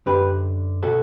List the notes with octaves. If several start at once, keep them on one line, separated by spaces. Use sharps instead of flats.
F#2 D3 G4 B4
B2 F#4 A4